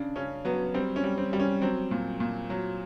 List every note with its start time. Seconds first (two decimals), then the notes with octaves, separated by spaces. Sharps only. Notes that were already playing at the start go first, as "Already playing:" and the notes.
Already playing: C#3 D4
0.16 C#3 C#4
0.45 F#3 B3
0.74 G3 C4
0.96 C#4
1.04 G3
1.18 C4
1.33 G3
1.40 C#4
1.61 F#3 C4
1.91 A#2
2.20 A#2
2.50 F#3